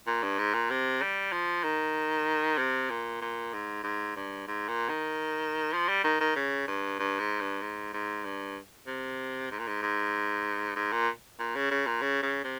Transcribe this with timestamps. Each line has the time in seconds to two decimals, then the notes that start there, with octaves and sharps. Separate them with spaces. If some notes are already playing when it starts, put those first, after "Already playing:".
0.07 A#2
0.23 G2
0.38 G#2
0.54 A#2
0.70 C3
1.02 G3
1.32 F3
1.64 D#3
2.58 C3
2.90 A#2
3.21 A#2
3.53 G#2
3.84 G#2
4.16 G2
4.47 G#2
4.68 A#2
4.89 D#3
5.73 F3
5.89 G3
6.04 D#3
6.20 D#3
6.35 C#3
6.68 G2
6.99 G2
7.19 G#2
7.41 G2
7.61 G#2
7.93 G#2
8.25 G2
8.87 C3
9.51 G#2
9.59 A#2
9.67 G#2
9.82 G#2
10.76 G#2
10.92 A#2
11.39 A#2
11.55 C#3
11.71 C#3
11.87 A#2
12.02 C#3
12.23 C#3
12.44 C3